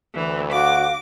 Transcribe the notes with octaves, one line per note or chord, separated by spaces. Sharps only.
D2 E3
F#4 F5 D6